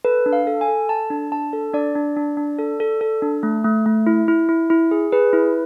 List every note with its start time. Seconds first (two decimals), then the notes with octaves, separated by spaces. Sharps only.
0.05 A4 B4
0.26 D4
0.33 F5
0.47 A4
0.61 G#5
0.68 A4
0.89 A4 A5
1.10 D4
1.32 D4 A5
1.53 A4
1.74 D4 D5
1.95 D4
2.16 D4
2.37 D4
2.59 A4
2.80 A4
3.01 A4
3.22 D4
3.43 A3
3.64 A3
3.86 A3
4.07 E4
4.28 E4
4.49 E4
4.70 E4
4.91 G#4
5.12 G#4 B4
5.33 E4